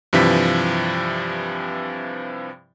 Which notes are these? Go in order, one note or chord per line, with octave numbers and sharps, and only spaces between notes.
G2 C3 E3 F3 B6